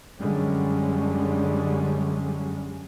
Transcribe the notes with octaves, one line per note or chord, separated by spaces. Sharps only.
F#2 D3 G3 G#3 C#4